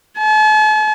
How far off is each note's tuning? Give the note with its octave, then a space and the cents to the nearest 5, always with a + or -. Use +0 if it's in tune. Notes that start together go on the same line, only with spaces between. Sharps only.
A5 -45